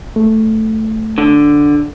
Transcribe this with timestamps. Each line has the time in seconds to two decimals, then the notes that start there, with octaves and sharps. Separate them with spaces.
0.16 A3
1.18 D3